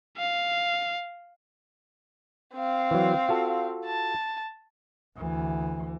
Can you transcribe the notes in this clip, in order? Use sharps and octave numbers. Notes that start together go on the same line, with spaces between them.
F5
C4 F5
E3 F#3
F4 F#4 A4
A5
D2 E3